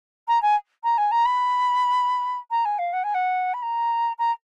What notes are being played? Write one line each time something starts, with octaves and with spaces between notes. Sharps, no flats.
A#5
G#5
A#5
G#5
A#5
B5
A#5
G#5
F5
F#5
G#5
F#5
B5
A#5
A#5